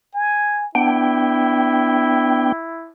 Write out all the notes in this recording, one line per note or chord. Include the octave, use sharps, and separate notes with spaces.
G#5
B3 D4 E4 G5